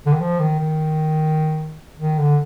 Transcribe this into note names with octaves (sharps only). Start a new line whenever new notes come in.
D3
D#3
F3
D#3
D#3
D#3
D3